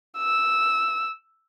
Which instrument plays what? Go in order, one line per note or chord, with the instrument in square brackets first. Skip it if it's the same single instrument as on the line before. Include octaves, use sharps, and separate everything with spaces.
[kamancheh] E6